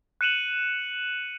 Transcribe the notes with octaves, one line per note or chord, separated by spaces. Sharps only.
F#6 C#7 D#7 E7 F#7